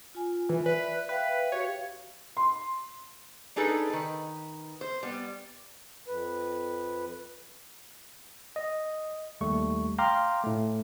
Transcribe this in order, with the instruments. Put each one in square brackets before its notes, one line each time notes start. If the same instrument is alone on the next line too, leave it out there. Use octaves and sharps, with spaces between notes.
[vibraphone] F4 G#5
[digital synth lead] E3
[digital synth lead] B4 [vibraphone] D5 E5
[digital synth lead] B4 [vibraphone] E5 F5 G5
[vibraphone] F#4 G4 F5 [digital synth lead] C#5
[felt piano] C6
[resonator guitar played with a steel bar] D4 D#4 G#4 A4 B4
D#3 B4
C5
G3 B3
[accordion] F2 B4
[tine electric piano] D#5
D#2 G3 A3 C#6
F5 G5 A#5 C6 D6 F6
A2 A3